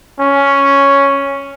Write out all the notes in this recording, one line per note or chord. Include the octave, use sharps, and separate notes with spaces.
C#4